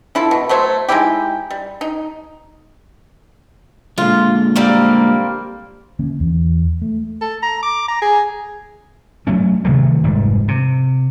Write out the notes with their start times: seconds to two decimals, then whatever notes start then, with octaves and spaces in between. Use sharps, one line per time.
0.15 F3 E4 A4
0.31 B2
0.49 F#3 A3 C5 C#5
0.89 G#3 D#4 E4 G4
1.50 G3
1.81 D#4
3.98 A#2 D3 G#3 F4
4.56 G3 A#3 C4
5.99 D3 A#3 C#4
6.20 E2
6.82 A3
7.21 A4
7.43 A#5
7.63 D6
7.88 A#5
8.02 G#4
9.27 F#3 A3 C#4
9.65 C3 D#3 F#3 A3
10.04 F1 G#2 G3
10.48 C3